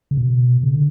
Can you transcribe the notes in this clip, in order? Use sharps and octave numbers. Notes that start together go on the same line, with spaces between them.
C#3
B2
C#3
D3